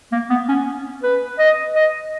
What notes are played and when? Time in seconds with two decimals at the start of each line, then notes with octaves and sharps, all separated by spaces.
0.12 A#3
0.30 B3
0.48 C#4
1.03 B4
1.39 D#5
1.75 D#5